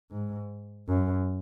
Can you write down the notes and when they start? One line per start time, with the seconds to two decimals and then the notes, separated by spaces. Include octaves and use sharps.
0.11 G#2
0.88 F#2